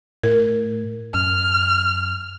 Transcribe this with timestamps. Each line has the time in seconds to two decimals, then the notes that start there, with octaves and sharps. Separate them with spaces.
0.23 A2 A#4
1.14 F#2 F6